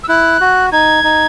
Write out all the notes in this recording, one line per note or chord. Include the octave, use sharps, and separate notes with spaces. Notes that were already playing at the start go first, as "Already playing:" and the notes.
E6
E4 F#6
F#4
D#4 G#6
D#4